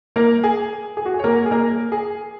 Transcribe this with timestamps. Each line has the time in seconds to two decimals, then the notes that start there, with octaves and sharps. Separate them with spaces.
0.16 A#3 A#4
0.44 G#4
0.97 G#4
1.06 F#4
1.14 G#4
1.19 C#5
1.24 A#3 A#4
1.46 G#4
1.51 A#3 A#4
1.92 G#4